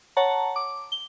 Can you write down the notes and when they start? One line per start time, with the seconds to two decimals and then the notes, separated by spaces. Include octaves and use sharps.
0.17 C#5 F#5 A5 A#5
0.56 D6
0.92 G7